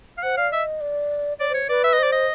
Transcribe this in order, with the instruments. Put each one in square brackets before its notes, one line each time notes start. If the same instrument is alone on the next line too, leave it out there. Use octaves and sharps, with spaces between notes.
[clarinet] F5
[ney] C5 [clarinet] F#5
[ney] D5 [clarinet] F5
[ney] D#5 [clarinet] E5
[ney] D5
[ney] C#5 [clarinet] D5
[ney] C5
[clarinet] C#5
[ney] B4 [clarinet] D5
[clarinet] E5
D#5
[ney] C5 [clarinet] D5
[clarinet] D#5